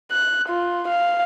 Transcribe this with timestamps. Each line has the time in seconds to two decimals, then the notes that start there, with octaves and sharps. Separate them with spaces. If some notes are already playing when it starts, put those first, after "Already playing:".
0.12 F#6
0.49 F4
0.88 F5